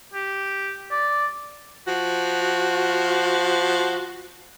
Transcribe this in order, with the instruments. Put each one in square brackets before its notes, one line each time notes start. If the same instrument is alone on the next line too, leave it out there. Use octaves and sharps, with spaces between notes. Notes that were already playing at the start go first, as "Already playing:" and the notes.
[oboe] G4
D5
[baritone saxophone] F3 [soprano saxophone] F#4